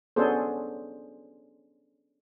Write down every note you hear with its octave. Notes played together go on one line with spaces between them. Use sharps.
B3 C#4 D4 G#4 A4 C5